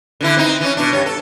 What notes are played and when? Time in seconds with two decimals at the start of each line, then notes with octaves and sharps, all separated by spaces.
0.21 D3 E3 E4
0.37 C4 D#4
0.61 E3 C#4
0.77 B2 D4
0.92 G2 C#5
1.06 A4